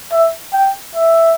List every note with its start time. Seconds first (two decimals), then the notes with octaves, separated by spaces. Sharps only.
0.12 E5
0.53 G5
0.95 E5